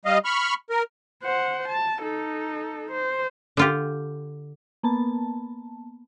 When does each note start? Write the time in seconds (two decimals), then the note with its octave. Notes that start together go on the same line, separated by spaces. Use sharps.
0.05 G3 D#5 F5
0.25 B5 C#6 F6
0.70 A#4
1.23 C5 F#5
1.68 A5
2.01 D#4 A4
2.92 C5
3.57 D3 F4 G4
4.83 A#3 B3 A5